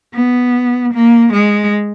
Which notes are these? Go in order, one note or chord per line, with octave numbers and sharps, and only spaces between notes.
B3
A#3
G#3